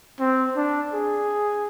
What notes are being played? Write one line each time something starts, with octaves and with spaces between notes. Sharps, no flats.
C4
D4
G#4